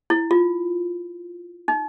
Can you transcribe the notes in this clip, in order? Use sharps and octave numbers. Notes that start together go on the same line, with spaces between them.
E4
F4
D#4